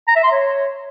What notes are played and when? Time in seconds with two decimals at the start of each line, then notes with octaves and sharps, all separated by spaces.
0.08 A#5
0.16 E5
0.24 C6
0.32 C#5